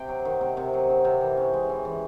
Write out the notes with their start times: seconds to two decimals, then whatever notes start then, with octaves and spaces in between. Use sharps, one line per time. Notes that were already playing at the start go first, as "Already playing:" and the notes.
Already playing: C3 G5
0.09 F#3
0.25 D#3
0.41 C3
0.57 C3
0.73 F#3
0.90 D#3
1.05 C3
1.21 E3
1.37 C#4
1.53 G#3
1.69 E3
1.85 E3